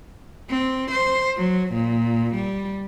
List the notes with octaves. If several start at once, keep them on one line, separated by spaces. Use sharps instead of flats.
C4
C5
F#3
A#2
G3